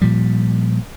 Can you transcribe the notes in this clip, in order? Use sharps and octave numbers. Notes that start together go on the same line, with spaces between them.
A#2 F3 G3